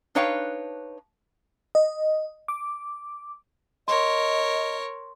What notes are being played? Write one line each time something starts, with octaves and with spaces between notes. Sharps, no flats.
D4 D#4 B4 C#5 F5 G5
D#5
D6
A#4 C#5 D#5 C6